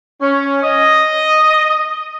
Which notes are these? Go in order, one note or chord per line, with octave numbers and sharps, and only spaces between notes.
C#4
D#5